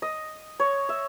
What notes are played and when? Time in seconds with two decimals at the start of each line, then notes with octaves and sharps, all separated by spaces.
0.02 D#5
0.60 C#5
0.89 E5